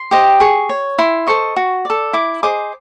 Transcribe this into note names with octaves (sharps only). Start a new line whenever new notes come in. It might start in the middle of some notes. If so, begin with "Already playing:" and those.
Already playing: C6
G4 C5 D#5
G#4 C#6
C#5
E4 C6
A4 C5 D#5 C#6
F#4
A4 D5
E4 D6
G#4 C5 D#5 D6